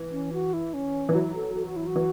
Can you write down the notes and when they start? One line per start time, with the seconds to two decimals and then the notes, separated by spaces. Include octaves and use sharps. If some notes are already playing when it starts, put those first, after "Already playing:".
Already playing: E3
0.12 C#4
0.33 F#4
0.53 E4
0.74 C#4
1.09 E3
1.14 F#3 E4
1.35 A4
1.56 A4
1.65 F#4
1.76 E4
1.87 F#4
1.96 E3